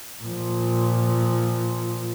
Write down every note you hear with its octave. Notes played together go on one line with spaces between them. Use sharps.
A#2 F3